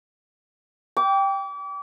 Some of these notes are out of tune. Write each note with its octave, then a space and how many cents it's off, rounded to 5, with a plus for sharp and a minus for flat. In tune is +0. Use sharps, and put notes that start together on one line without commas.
G5 +5 D6 -35